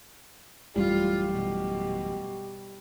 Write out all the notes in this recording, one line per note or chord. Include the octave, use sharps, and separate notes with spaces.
A1 F#2 A2 G3 F4 G4
B2